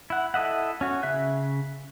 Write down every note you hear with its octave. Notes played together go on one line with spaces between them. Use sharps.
E4 F#5
E4 A4 D#5 E5 F#5
C#4 F#4
C#3 E5 F#6